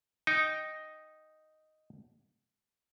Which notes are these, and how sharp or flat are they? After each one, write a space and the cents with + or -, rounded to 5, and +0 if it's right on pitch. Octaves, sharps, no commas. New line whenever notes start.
D#4 +0 G5 +0